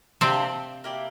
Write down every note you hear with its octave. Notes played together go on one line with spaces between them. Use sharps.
C3 A#3 C4 D4 G4
A#3 E4 G4 D5